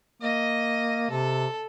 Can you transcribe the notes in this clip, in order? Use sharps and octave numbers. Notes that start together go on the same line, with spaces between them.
A#3 D#5
C3 A4